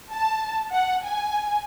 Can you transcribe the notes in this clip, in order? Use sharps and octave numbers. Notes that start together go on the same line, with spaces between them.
A5
F#5
G#5